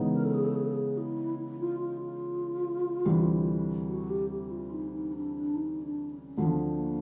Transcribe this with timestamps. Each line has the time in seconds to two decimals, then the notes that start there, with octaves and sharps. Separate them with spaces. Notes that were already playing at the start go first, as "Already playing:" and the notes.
Already playing: C#3 E3 G#3 B3 D#4
0.14 A#4
0.24 A4
0.34 G#4
0.44 A4
0.56 G#4
0.64 A4
0.73 G#4
0.98 E4
1.39 E4
1.60 F4
1.80 F4
2.01 F4
3.05 D2 C3 E3 G3
3.88 F#4
4.09 G4
4.30 G4
4.51 F4
4.71 D#4
4.92 D#4
5.13 D4
5.34 D4
5.54 D#4
5.82 D4
6.10 C#4
6.37 D2 D3 F3 C4
6.47 B3
6.56 C4
6.79 A#3